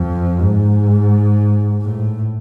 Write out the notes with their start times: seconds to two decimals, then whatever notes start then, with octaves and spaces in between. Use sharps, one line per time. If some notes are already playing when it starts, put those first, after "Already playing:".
Already playing: F2
0.41 G#2
1.82 A2